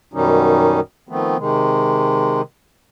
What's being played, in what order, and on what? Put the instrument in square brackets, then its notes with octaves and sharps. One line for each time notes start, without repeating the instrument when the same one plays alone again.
[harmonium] F#2 B2 D#3 G3 C#4 D#4
D#3 F3 A3 B3 C4
C3 D#3 G#3